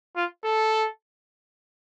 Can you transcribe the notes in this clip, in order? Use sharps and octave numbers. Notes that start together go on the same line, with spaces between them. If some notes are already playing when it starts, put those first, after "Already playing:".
F4
A4